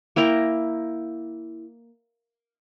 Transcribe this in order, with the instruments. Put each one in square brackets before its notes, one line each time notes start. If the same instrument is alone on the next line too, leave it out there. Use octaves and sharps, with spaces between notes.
[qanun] A#3 E4 G5 A#5